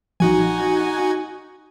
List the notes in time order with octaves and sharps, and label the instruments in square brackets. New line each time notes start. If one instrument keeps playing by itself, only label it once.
[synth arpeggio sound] A#1 [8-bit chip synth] D#4 F#4 G#5